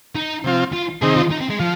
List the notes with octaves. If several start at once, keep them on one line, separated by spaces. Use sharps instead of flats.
D#4
C3 F3 C4 F4
F4
C3 D#3 C4 D#4 G#4
F4
D#4
C4
G#3
F3 F4